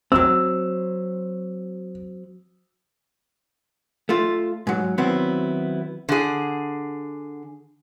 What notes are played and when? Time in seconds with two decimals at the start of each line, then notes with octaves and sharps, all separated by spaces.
0.12 F#3 C4 E6
4.09 A3 F4
4.67 G#2 F#3
4.98 D#3 F#3 B3 C4 E4
6.09 D3 G#4